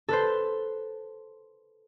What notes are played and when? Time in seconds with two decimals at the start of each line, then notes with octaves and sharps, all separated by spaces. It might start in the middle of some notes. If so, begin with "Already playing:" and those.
0.08 A4 B4 C5